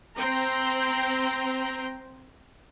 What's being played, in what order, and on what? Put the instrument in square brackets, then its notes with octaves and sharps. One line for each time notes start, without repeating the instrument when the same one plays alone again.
[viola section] C4 C5 G5 A#5